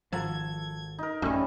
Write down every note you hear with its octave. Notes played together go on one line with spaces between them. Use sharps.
G#1 F3 A4 F#5 A#5 G#6
D#4 A#4
A1 F#2 G3 A3 C#4